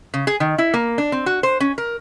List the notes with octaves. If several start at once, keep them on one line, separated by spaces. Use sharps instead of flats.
C#3
G#4
D#3
E4
A#3
D4
C4
F#4
C5
C#4
A#4